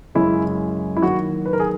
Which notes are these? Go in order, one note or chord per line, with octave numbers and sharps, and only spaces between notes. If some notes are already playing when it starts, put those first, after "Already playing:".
F#2 C#3 G#3 E4
E4
D#3 F#3 A#3 F#4
B4
A#4
G#4